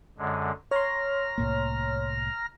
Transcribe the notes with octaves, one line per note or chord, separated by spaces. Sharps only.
F#2 D3 G#3
C#5 A#5 C6 F6 A#6
C2 A2 A#3